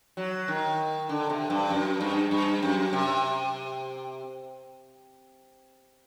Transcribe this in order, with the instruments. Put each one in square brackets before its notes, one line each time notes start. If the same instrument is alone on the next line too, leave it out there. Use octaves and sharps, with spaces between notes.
[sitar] F#3
D#3
D3
C3
G2
F#2
G2
G2
F#2
C3